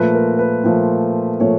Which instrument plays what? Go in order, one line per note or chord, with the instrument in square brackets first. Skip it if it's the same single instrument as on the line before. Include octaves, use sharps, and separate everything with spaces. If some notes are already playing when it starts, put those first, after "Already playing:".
Already playing: [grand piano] A#2 F3 A3 B4
A#4
B4
A#2 F3 A3
A#2 F3 A3 C#5